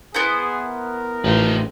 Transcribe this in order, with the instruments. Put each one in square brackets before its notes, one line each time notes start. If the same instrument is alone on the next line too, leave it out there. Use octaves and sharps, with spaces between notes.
[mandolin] B3 E4 C5 [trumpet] G#4
[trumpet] A#4
[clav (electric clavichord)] A1 [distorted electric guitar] F3 D#4